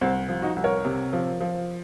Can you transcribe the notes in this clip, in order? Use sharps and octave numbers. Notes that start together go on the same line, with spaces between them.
C2 C4
F3
D#4 F#4
C2
A#4 C#5
C3
F3
F3